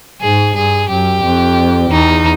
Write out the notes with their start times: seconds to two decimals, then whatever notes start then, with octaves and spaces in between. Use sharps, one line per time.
0.21 G#2 G#4
0.56 G2 G#4
0.89 F#2 G4
1.23 F2
1.91 E2 D#4